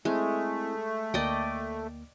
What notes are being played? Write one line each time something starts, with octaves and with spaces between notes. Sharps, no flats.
G#3 A3 C4 E4
D2 A#3 D5 D#5 G5